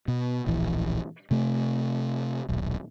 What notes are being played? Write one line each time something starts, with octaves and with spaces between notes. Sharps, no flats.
B2
D1 A#1 E3
C3 A3
D#1 B1